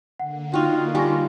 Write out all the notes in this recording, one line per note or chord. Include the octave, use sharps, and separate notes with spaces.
D3 A#3 F#5
D#4 F4 F#4 G5
G3 F4 G#5 C#6 A#6